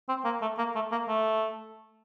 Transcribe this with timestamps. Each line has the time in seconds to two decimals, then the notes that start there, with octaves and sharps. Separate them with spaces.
0.09 C4
0.25 A#3
0.41 A3
0.58 A#3
0.75 A3
0.92 A#3
1.08 A3